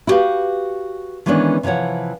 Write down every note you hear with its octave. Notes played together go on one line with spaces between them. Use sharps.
E4 F#4 G4 A#4 B4 F5
D#3 E3 G#3 B3 C#4 D4
C3 E3 F3 C#5 F#5